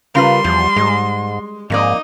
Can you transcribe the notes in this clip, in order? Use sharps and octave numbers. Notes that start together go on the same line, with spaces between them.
C#3 G3 F4 A#4 B4 C6
E2 F3
G#2 G#3
F2 G#2 A#3 D#4 D5 D#5